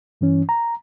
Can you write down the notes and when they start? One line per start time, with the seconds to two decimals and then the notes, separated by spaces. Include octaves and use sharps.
0.21 G2 E3 C#4
0.49 A#5